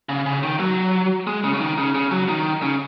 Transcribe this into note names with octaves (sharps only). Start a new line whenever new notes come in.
C#3
C#3
D#3
F#3
G#3
C#3
C#3
D#3
C#3
C#3
F#3
D#3
C#3